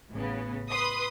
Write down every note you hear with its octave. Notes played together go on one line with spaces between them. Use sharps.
A1 C#3 B3
B4 C6 D#6